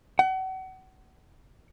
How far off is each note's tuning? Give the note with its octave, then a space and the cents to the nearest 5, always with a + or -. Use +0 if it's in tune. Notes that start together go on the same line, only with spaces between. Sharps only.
F#5 +35